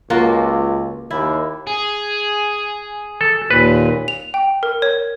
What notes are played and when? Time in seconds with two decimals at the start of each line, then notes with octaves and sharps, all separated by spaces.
0.10 C#2 A#3 F4 F#4
1.11 D#2 E4
1.67 G#4
3.21 A4
3.51 D#2 A#2 B4
4.08 F7
4.34 G5
4.63 A#4
4.82 C#5